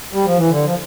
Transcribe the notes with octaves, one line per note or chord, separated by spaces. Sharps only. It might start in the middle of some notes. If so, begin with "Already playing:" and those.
G3
F3
E3
D3
F3